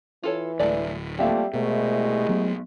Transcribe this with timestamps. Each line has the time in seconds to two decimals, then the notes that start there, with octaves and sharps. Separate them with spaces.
0.23 E3 F4 A4 C#5
0.59 D1 G#3 A3 D5
1.19 F3 G3 A3 A#3 C4 E5 F5
1.54 C2 B2 G#3 A3
2.29 F#3 B3